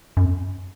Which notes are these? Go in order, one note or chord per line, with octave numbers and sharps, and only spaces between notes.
F#2